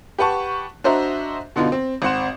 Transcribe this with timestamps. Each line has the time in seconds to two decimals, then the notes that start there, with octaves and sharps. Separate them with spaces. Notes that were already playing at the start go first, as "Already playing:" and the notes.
0.19 G4 B4 F#5 A5 C#6
0.84 D4 F#4 C5 D#5 E5 A#5
1.56 B2 D3 B3 D#4 F4
1.72 C4
2.02 G#1 C4 F#5 C6 E7